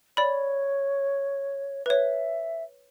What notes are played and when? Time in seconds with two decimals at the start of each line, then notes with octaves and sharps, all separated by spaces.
0.17 C#5 D5 B5
1.86 B4 C#5 E5